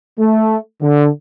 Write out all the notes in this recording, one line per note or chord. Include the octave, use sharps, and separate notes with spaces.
A3
D3